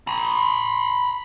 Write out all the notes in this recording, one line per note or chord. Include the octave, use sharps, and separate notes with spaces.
A#5 B5